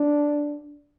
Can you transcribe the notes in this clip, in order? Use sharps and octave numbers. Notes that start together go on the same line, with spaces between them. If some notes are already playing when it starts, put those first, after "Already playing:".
Already playing: D4